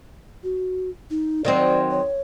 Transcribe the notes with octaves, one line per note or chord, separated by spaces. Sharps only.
F#4
D#4
D#3 F#3 C4 D5
C#5